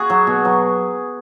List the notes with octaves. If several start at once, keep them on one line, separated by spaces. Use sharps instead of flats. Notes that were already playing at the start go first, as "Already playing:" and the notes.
Already playing: F#4 G#4
F#3
B2
F#3